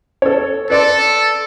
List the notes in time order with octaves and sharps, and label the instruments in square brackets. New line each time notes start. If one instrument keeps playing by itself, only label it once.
[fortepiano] A4 C#5
[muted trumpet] A4 [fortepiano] B4 D5 C6